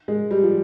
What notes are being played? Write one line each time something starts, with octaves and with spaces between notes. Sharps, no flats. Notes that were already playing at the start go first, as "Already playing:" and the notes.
G#3
G3
F3